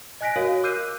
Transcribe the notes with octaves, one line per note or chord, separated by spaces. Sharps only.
D#5 G#5 F#6 A#6 B6 D7
F#4 A#4 C#5 F5
D6 E6 F#6 G6 C7 D#7